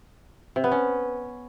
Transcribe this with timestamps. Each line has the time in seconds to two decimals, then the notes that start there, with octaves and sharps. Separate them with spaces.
0.56 C3
0.64 B3
0.72 C#4